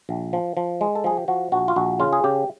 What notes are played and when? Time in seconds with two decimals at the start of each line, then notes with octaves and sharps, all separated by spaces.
0.09 A#1
0.33 F3
0.57 F3
0.81 G#3
0.95 A4
1.04 F3 G#4
1.17 G4
1.28 F3 F#4
1.52 A#1 F#4
1.68 F4
1.76 A#1 F#4
2.00 C#3 F4
2.13 G#4
2.24 C#3 G4